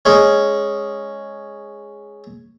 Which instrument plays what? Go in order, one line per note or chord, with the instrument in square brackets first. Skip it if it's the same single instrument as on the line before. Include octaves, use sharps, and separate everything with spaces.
[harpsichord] G#3 C#4